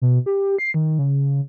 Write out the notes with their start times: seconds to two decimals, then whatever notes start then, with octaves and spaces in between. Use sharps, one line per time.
0.01 B2
0.26 G4
0.58 C7
0.74 D#3
0.99 C#3